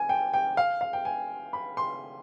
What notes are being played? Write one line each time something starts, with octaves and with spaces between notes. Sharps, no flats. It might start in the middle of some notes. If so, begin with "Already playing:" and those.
Already playing: G#5
G5
G5
F5
F5
G5
G#5
B5
C6